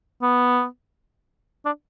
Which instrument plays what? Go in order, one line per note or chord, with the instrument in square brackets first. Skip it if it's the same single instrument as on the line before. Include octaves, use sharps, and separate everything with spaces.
[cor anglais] B3
D4